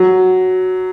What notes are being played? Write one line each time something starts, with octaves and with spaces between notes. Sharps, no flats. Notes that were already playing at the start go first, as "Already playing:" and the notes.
Already playing: F#3